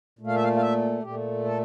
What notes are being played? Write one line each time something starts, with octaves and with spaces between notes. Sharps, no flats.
A#2 A3
F5
E5
F5
F5
E5
A#2 A3 G4
A4